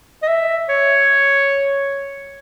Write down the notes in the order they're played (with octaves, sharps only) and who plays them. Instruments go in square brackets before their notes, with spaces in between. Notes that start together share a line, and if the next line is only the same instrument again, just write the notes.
[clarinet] D#5
E5
C#5